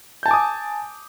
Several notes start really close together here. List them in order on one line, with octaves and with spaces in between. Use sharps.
G6 A5 G#5 D6 D#6